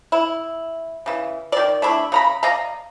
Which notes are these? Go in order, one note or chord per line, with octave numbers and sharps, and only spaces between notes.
E4
C#3 E3
D#3 D5
A3 D4 E4
C#3 A#5 B5
D5 D#5 F5 A#5